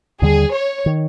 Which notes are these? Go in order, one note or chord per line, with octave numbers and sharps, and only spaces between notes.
D#2 D3 G3 G#4
C#5
D#3